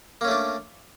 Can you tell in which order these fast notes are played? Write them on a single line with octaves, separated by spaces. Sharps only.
A#3 C#4 A3 D4